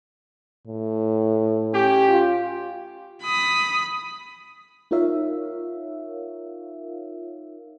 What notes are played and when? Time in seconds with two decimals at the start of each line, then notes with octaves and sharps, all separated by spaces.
0.67 A2
1.74 C#4 G4
2.09 F4
3.23 B5 D#6
4.91 D#4 F4 A#4 C#5 E5 F5